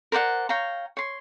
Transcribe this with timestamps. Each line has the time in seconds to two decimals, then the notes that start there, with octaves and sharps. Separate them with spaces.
0.12 A#4 C5 D5 F#5
0.49 C#5 F5 G5 A#5
0.97 C#5 C6